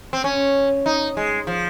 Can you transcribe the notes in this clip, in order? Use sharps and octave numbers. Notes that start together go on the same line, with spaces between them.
C4
C#4
D#4
G#3
F3